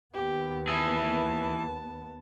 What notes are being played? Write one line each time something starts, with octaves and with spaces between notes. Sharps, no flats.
D#2 B3 G4
E3 G#4 A5